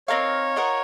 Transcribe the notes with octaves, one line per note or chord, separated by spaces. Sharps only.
C4 D#4 A#4 C#5 F5
F4 A#4 D#5 F#5